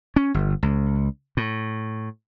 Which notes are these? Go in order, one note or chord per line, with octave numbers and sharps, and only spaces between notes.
C#4
G1
C#2
A2